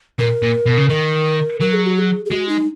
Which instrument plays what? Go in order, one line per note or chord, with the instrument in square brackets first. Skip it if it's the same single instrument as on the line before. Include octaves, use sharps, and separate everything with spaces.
[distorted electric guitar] A#2 [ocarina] A#4
[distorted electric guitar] A#2
B2
C#3
[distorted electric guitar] D#3 [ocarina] A#4
[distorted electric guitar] F#3 [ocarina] A#4
[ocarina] G#4
F#4
G#4
G#4
[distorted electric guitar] G#3 [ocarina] F#4
[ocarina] D#4